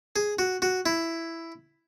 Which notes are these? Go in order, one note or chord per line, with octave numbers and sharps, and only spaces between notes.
G#4
F#4
F#4
E4